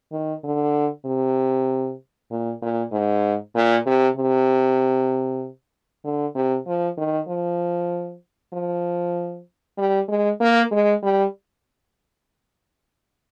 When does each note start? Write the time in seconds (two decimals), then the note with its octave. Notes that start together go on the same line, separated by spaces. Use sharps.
0.12 D#3
0.44 D3
1.06 C3
2.31 A#2
2.62 A#2
2.92 G#2
3.55 A#2
3.86 C3
4.17 C3
6.04 D3
6.35 C3
6.67 F3
6.98 D#3
7.28 F3
8.53 F3
9.78 G3
10.08 G#3
10.41 A#3
10.72 G#3
11.03 G3